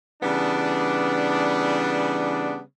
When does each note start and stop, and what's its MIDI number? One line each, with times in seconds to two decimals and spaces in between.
0.23 2.60 49
0.23 2.60 52
0.23 2.60 55
0.23 2.60 59
0.23 2.60 62